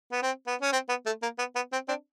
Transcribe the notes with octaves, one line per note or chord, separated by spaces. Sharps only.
B3
C4
B3
C#4
C4
B3
A3
A#3
B3
B3
C4
C4 D4